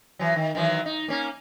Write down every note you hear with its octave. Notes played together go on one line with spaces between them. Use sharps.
E3 F#3
D#3
D#3 E3 F#3
D#4
A#3 C#4